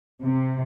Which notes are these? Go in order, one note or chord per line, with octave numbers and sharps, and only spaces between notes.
C3